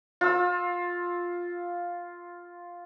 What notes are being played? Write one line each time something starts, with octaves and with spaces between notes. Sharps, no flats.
F4 E6